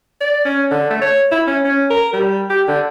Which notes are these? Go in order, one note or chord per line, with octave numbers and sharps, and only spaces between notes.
D5
C#4
D3
A3
C#5
E4
C#4
C#4
A#4
G3
G4
D3